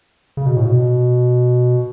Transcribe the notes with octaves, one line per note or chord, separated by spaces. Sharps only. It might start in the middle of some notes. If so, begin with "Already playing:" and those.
C#3
B2
A2
B2